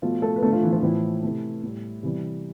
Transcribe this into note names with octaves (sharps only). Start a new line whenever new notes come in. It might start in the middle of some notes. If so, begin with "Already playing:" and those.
B2 F3 A3 F4
A3 A4
B4
D3 A3 A4
F3 F4
E3 E4
F3 F4
A2 E3 F3 A3 E4
C3 E3 A3
A2 G3
C3 E3 G3